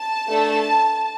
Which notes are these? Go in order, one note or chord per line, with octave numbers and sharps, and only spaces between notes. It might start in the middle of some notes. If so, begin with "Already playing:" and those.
Already playing: A5
A3 D4 A4